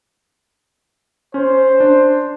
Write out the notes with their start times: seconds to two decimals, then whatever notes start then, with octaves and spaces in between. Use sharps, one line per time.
1.34 C#4 C5
1.80 D4